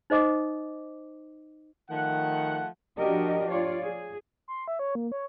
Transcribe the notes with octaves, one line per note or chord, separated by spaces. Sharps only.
D#4 C5 D#5 D6 D#6
D#3 F3 A3 F#5
F3 D4 F#4 G4 A#4 D#5
F4 C#5 D5
G#4
C6
E5
C#5
A#3
C#5